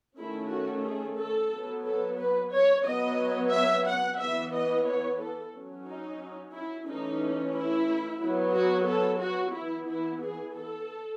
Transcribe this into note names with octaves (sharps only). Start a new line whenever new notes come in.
D#3 A3 C#4 E4
F#4
G#4
A4
F#3 B3
A4
B4
C#5
F#3 B3 D#5
E5
F#5
E3 B3 E5
D#5
C#5
A4
F#3 C#4
D#4
E4
E3 A3 C#4 D#4
E4
F#3 B3
F#4
A4
F#4
E3 B3 E4
E4
G#4
A4